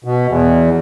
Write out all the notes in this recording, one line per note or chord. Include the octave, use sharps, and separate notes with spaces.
B2
E2